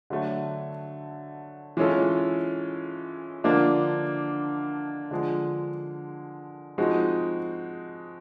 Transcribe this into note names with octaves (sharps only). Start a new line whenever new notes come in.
D3 F#3 A3
E3 G#3 C#4 F4 A4
D3 F3 A#3 D4
D3 F3 G#3
F3 G#3 C4 D#4 F#4